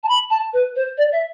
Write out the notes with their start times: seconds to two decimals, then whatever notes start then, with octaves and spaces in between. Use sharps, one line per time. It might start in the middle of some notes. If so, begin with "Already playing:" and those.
0.03 A5
0.09 B5
0.30 A5
0.53 B4
0.76 C5
0.98 D5
1.12 E5